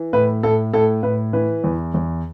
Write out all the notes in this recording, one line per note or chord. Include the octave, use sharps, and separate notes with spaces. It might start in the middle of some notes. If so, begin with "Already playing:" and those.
Already playing: E3
A2 B4
A2 A4
A2 A4
A2 B4
E3 B4
E2
E2